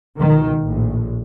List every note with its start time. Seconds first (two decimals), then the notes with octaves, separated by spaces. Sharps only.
0.17 C#2 B2 D#3
0.61 A#1 A2